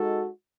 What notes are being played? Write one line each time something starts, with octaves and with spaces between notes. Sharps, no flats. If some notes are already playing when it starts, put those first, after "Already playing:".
Already playing: G#3 D#4 F#4 A4